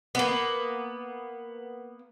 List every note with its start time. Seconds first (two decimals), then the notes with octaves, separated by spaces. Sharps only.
0.15 A#3 B3